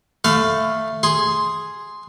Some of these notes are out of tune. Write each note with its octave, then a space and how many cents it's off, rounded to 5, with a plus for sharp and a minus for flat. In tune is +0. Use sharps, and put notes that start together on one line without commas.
A3 +5 F5 +0 B5 +40
G#4 +0 C6 +0